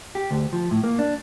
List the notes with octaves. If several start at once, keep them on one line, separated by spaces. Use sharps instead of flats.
G4
D2
F3
A2
A#3
D4